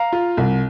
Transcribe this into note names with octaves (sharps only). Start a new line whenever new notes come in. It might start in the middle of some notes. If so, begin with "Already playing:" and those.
Already playing: F5 A#5
F4
C2